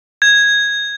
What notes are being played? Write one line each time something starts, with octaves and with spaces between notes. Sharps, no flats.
G#6